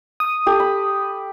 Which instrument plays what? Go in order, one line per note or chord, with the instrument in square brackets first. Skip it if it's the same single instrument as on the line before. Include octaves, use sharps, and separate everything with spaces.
[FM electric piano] D#6
[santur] G4 A4
B5